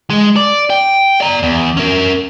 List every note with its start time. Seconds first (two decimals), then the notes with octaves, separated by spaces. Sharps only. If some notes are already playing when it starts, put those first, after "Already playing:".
0.10 G#3
0.36 D5
0.70 G5
1.21 D5 A#5
1.43 E2
1.77 C#4 A#4